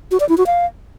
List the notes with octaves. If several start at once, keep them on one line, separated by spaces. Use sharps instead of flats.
F#4
D5
E4
F#4
F5